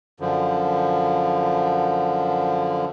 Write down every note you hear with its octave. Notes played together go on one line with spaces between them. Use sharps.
F#2 D3 F3